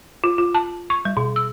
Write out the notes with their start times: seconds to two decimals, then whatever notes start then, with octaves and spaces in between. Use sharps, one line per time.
0.24 F4
0.38 F4
0.55 A5
0.90 C#6
1.05 G3
1.17 B2
1.36 E6